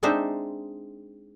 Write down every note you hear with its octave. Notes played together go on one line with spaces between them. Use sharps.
G#3 C4 D4 D#4 C5 E5